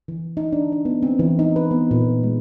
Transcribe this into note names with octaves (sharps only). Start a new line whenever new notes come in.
E3
D#4
D4
D4
B3
C4
E3
D#4
B4
B3
A#2
G#3